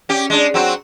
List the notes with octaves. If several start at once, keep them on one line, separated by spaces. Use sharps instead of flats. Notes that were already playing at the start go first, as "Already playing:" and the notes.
C#4 G4
G#3 D4
F#3 C4 F#4